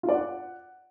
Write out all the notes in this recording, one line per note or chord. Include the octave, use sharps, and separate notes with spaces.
F4
D5
F#5